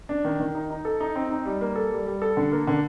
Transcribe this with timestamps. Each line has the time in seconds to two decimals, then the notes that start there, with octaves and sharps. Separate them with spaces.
0.09 D4
0.25 D#3
0.40 D#3
0.55 D#4
0.70 D#4
0.85 A4
1.00 D#4
1.16 C4
1.31 D#4
1.45 G3
1.61 A#3
1.76 A4
1.92 G3
2.06 G3
2.22 A4
2.37 D3
2.52 A#3
2.67 D3